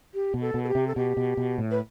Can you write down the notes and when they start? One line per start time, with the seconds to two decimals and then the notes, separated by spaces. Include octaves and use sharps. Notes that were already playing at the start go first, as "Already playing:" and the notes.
0.14 G4
0.34 B2
0.41 A4
0.54 B2
0.63 A4
0.68 G4
0.75 C3
0.87 A4
0.96 B2 G4
1.17 B2
1.37 B2
1.58 A2
1.71 B4